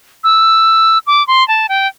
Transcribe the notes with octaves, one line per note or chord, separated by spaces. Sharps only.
E6
D6
C6
A5
G5